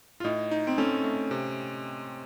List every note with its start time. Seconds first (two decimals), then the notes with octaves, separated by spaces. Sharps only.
0.20 F4
0.24 A2 D#4
0.51 D#4
0.67 C4
0.78 C#4 A4
1.04 A3
1.31 C3